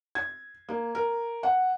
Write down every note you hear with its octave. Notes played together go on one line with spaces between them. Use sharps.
G#6
A#3
A#4
F#5